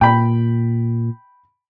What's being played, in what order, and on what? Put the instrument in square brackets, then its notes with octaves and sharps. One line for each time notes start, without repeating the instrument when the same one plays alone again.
[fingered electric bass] A#2 [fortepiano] G5 B5